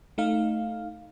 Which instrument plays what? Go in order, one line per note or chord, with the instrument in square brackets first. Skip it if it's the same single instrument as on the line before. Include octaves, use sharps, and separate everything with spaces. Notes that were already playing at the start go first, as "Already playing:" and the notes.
[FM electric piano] A3 D#4 F5